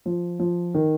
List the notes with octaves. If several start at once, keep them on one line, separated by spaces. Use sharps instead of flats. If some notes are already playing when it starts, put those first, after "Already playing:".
F3
F3
D#3